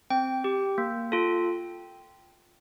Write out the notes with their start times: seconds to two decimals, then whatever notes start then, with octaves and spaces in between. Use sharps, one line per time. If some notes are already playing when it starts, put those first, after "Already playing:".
0.10 C4 G5
0.44 G4
0.78 A#3
1.12 F4 A4